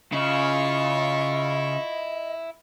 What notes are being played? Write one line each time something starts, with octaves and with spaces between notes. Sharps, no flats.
C#3 E4 F4 D#5 C#6